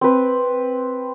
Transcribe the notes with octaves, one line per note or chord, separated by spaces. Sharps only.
C4 B4